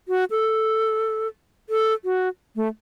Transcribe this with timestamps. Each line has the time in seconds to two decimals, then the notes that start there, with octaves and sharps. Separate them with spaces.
0.08 F#4
0.30 A4
1.69 A4
2.04 F#4
2.56 A3